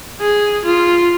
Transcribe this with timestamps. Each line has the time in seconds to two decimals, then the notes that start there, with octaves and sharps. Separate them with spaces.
0.21 G#4
0.65 F4